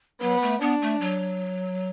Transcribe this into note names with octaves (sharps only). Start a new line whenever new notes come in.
F#3 B3
A3
B3 D4
A3
F#3